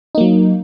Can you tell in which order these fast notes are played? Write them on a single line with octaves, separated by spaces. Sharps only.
D#4 A#3 F#3